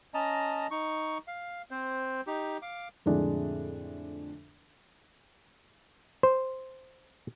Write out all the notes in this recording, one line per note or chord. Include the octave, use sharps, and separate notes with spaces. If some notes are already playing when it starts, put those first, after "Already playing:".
C#4 D#5 A5 A#5
D#4 C#6
F5
C4 C5
D#4 G4
F5 D6
F2 A2 D3 G#3 D4
C5